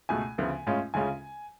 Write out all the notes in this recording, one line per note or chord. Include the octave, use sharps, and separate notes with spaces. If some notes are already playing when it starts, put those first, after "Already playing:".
C#2 B2 A3 G#5
D2 C#3 F3 B3
A2 G#3 C#4 F4
D2 C#3 G#3 C#4 F4 G#5